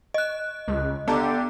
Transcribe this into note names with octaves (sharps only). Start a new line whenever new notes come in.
D#5 F#6
C#2
D3 B3 D4 G4 D5 A#5